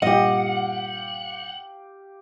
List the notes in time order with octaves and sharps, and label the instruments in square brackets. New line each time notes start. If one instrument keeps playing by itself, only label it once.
[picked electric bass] G2 A#2 [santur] G4 F5 [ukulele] D#5 [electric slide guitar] F#5